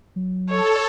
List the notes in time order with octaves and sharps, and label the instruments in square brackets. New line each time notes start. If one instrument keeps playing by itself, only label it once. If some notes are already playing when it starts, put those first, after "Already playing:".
[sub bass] F#3
[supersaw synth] A4 [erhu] C#5